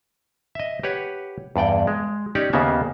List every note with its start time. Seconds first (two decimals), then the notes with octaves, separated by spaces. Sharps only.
0.55 D#5 E5
0.83 G4 B4 C#5 F#5
1.56 E2 G2 D5 G5
1.87 G#3
2.35 C#4 D#4 G4 C#5 D5
2.53 D#2 C#3 A#3 B3 E5